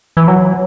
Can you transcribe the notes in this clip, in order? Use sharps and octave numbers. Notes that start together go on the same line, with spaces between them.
E3
F#3